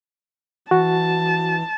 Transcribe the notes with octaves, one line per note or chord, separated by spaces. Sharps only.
E3 F#4 A5